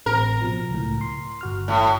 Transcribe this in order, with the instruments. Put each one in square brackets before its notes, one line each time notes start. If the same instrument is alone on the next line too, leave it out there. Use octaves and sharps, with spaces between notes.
[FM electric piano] A1 C4 [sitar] A#4
[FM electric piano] B2 F3
C#2 A2
C6
G1 F#4 F6
[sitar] A2